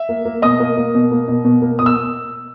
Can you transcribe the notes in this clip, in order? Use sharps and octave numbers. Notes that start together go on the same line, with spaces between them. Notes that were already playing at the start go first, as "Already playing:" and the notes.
Already playing: E5
A#3
A#3
B2 D#5 D#6
A#3
A#3
B2
A#3
B2
B2
A#3
B2 D#6
E6